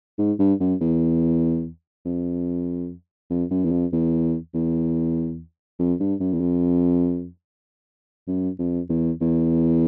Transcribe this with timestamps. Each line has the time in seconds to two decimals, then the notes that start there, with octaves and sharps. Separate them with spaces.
0.18 G#2
0.39 G2
0.60 F#2
0.81 E2
2.05 F2
3.30 F2
3.51 F#2
3.64 E2
3.71 F2
3.92 E2
4.54 E2
5.79 F2
6.00 G2
6.20 F#2
6.33 E2
6.40 F2
8.28 F#2
8.59 F2
8.89 E2
9.21 E2